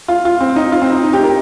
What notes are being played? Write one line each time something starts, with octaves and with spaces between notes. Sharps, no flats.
F4
F4
C4
D#4
F4
C4
D#4
D#4
G4
A#4